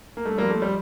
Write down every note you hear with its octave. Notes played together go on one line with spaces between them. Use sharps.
A#3
G2 A3
F3 G3 A#3
A3
G3